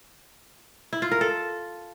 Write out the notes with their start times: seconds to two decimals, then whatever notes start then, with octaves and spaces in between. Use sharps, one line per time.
0.93 E4
1.02 F4
1.11 A#4
1.21 A4